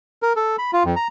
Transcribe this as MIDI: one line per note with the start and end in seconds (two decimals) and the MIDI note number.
0.23 0.33 70
0.36 0.56 69
0.58 0.71 83
0.73 0.83 65
0.85 0.95 41
0.96 1.08 82